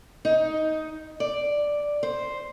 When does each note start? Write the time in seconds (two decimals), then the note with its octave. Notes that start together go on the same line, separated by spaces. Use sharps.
0.25 D#4
1.20 D5
2.03 C5